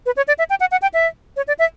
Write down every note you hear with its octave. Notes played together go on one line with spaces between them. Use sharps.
B4
C#5
D5
E5
G5
F#5
F#5
G5
E5
C#5
D5
E5